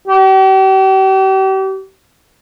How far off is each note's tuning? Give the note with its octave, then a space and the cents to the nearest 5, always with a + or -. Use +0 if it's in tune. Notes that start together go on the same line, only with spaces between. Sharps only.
G4 -40